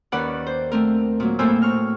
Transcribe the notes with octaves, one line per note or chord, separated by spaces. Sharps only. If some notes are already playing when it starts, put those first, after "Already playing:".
D#2 D#3 C#4 B4 D5 F#5
C5
A3 C4 A#4
A#2 F#3
A2 A#3 C4 C5 G#5 E6
C#6 F6